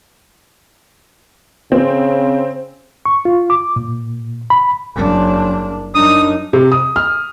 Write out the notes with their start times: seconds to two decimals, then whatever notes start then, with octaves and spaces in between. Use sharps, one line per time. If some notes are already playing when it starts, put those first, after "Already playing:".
1.72 C#3 C4
3.06 C#6
3.25 F4
3.50 D6
3.76 A#2
4.50 B5
4.95 F#1 D4
5.95 F#2 D4 D#4 D#6
6.53 C3
6.72 D#6
6.96 F6